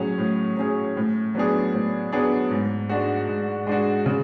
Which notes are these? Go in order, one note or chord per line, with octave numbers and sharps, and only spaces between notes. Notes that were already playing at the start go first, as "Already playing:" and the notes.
Already playing: A2 F#3 C#4 G#4
A2
F#3 C#4 G#4
A2
F#3 B3 D4 G#4
A2
F#3 B3 D4 G#4
G#2
G#3 D4 F#4
G#2
G#3 D4 F#4
C#3